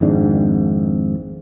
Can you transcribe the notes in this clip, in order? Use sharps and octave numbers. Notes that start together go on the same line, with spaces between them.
G#1 F2 G#2 D4